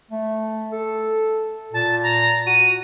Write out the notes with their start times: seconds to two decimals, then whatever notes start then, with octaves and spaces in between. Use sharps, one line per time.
0.11 A3
0.72 A4
1.73 A#2 A5
2.03 A#5
2.47 F#4 D#7